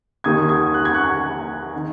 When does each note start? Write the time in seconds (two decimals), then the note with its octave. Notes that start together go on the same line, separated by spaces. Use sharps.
0.24 D#2 D#3 A#3 D#6 G#6
0.49 D#6 G#6
0.74 F#6
0.85 G#6
0.94 C#6 F#6
1.76 D#3